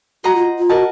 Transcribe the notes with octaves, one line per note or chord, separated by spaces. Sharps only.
F#4 C5 D#5 F#5 A#5
F4
F4
F#4 A#4 D#5 F#5 A5